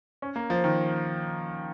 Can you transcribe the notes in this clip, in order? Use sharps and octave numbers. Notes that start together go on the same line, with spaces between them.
C#4
A#3
F3
D#3